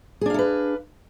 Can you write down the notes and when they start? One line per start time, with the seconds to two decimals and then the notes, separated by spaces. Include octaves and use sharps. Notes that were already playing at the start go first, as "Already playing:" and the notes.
0.21 G#4
0.26 D4
0.30 F5
0.34 A4
0.39 B4